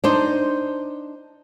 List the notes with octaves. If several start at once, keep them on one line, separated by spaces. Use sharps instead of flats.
D4 D#4 C5